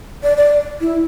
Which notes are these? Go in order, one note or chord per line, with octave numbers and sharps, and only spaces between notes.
D5
D5
E4